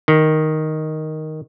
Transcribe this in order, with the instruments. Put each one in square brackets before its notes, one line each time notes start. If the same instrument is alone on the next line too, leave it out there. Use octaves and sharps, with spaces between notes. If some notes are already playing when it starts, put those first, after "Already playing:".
[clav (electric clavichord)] D#3